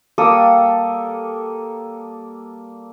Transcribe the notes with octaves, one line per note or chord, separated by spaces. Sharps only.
G3 A#3 A4 D#6